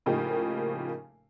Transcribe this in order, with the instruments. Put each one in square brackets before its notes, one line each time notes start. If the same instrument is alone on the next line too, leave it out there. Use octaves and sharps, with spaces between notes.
[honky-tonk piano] A2 C#3 F3 A#3 D#4 G4